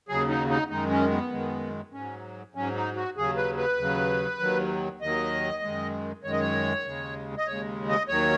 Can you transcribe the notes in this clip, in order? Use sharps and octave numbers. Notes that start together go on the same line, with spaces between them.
D#2 C#3 F#3 G#4
D#4
D#4
F#2 D#3 G#3 D#4
C#4
B3
F#2 D#3 G#3
G#2 F#3 C#4
G#2 F#3 C#4
D#4
F#4
D#2 C#3 F#3 G#4
B4
B4
D#2 C#3 F#3
D#2 D#3 F#3
D#2 D#3 F#3 D#5
F#2 D#3 G#3
F#2 D#3 G#3 C#5
D#5
C#5
D#2 C#3 G#3
D#5
D#2 C#3 G#3 C#5
D#5
D#2 D#3 F#3 C#5